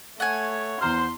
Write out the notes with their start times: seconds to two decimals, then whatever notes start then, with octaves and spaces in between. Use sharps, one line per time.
0.20 A3 C#5 F#5 G#5
0.81 E2 C5 A#5 C6 F6